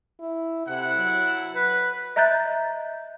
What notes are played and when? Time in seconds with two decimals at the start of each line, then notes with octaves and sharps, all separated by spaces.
0.20 E4
0.68 C3 E4 A4 F#5
0.97 F#3
1.55 B4
2.16 D#5 E5 A#5 F#6 G6 A6